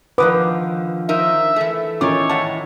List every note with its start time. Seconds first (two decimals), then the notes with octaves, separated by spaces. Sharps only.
0.18 D3 D#3 F3 B4 D6 D#6
1.09 D#4 A#4 C5 E5
1.56 E3 A3
2.01 D#3 E3 C#4 F4 C#5 D6
2.30 A2 F#5 A5